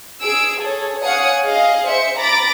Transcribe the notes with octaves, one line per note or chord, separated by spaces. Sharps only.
G#4 E6 D7
G#4 A4 C#5
C#5 F5 F#5 G#5 D#6 C#7
G#4 D#5 F5
C5 E5 C#7
A#5 B5 D6 A6 A#6